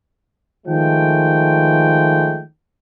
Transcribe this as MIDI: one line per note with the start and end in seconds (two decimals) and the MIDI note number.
0.66 2.42 51
0.66 2.42 53
0.66 2.42 56
0.66 2.42 57
0.66 2.42 79